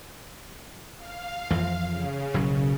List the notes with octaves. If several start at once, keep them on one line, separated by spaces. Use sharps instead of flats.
F5
F2 E3 F3
C#3
F#1 B1 F#3